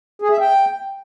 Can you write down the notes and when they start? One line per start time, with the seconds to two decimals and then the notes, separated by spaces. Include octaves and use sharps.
0.22 G#4
0.31 E5
0.40 G5